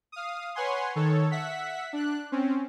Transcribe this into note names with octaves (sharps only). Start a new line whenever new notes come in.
F5 D#6
B4 C#5 F#5 G#5 C6
D#3 A4 C#5
E5 F#5 B6
D4 F#6
C4 C#4